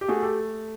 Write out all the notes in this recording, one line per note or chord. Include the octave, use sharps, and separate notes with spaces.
G4
A3 F#4 G#4
G4 A4